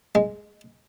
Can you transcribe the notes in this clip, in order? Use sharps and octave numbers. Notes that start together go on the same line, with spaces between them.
G#3